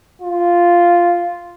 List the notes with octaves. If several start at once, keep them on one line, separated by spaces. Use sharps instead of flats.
F4